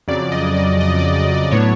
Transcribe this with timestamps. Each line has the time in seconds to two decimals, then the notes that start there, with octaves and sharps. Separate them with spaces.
0.08 F2 C#3 F#3 D5
0.32 D#5
0.56 D5
0.80 D#5
0.99 D5
1.16 D5
1.34 D5
1.51 A2 F#3 B3 D4 C#5